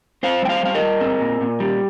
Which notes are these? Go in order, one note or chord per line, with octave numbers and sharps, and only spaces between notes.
C4 C5 F5
G3 G5
C5 F5
G3 F5
A#4 D#5
G3
C4
A#2
A#2
G3